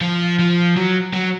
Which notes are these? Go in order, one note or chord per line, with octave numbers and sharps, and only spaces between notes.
F3
F3
F#3
F#3